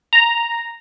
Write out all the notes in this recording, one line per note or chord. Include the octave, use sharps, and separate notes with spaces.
A#5